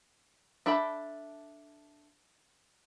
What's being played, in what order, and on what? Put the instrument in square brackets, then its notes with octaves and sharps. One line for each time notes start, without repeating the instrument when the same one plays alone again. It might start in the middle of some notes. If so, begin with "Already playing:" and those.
[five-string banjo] D4 A4 E5 G5 B5